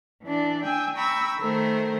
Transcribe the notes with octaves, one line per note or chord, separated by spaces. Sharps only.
E3 D4 D5
G5 G#5 E6
G5 A#5 B5 C#6 E6
D#3 A3 A#4 C5